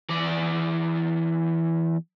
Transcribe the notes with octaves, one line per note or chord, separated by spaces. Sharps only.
E2 D5